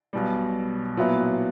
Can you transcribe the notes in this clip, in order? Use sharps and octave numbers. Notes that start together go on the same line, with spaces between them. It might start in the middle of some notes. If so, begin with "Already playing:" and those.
B1 B2 G3
A#2 F#3 B3 E4